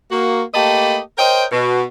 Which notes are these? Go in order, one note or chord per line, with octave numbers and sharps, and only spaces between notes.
A#3 F#4
A3 A#3 G4 D#5 A5 B5
A#4 C5 C#5 D#5 G5
B2